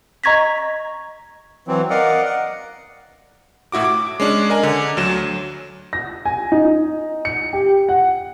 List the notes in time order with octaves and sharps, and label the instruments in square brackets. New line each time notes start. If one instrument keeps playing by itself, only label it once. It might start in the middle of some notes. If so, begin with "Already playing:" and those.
[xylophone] D#5 A#5 C#6 G#6 A#6 B6
[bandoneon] E3 F#3 C4
A#4 D5 D#5 F5 F#5
F#5
[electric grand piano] A2 E4 F#4 D6
D6
G#3 C#4 D4
A#4 D#5 G#5 A#5
D3
D2 F#3 E7
[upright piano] A#6
G#5
D#4
C#7
G4
F#5